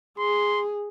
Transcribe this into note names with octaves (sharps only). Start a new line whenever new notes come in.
G#4 C6